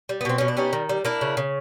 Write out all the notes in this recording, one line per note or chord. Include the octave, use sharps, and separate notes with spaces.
G3
B3
B2 C4
B2 C#4
D4
G3 C#4 D#4
D#3
G3
A#3 D4 E4
C#3
C#3